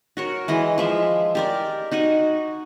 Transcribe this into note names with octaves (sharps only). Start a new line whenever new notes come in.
F#4 A#4 C#5
E3 G#3 D#5
F3 G#3 E5
G4 A#4 D5
D#4 F#4 F#5 G#5